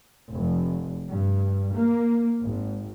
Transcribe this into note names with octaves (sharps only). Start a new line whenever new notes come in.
F1
G2
A#3
G#1